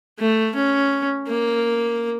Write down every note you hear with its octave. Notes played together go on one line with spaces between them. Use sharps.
A3
C#4
A#3